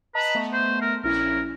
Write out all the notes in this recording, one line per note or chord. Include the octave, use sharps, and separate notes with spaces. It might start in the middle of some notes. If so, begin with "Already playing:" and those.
B4 D#5 A5 A#5
A3 B3
C5
A#4
A#1 C#4 E4 A#4